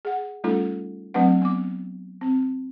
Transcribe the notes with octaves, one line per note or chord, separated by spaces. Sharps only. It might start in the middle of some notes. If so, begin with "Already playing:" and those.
G#4 F#5
G3 A3 C#4 D#4 F4 A4
F#3 A3 C4 D4 B4 F#5
B3 D6
C4